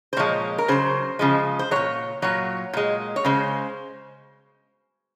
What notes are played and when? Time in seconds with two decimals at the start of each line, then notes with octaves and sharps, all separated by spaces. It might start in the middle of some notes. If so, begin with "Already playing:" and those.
0.13 C5
0.17 A#2 F3 G#3 C#5
0.58 A#4
0.68 C#3 F#3 C5
1.19 C#3 F3 G#3
1.59 C5
1.71 A#2 F#3 C#5
2.22 A#2 F#3 C#5
2.73 A#2 G#3
3.16 C#5
3.25 C#3 G#3 C5